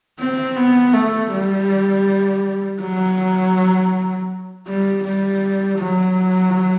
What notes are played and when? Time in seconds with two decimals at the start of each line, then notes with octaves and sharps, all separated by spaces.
0.19 C4
0.57 B3
0.93 A3
1.32 G3
2.81 F#3
4.67 G3
5.05 G3
5.79 F#3